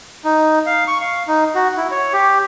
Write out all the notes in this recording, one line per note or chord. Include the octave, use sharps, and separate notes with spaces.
D#4
F5
C#6
F5
D#4
F#4
E4
C#5
G4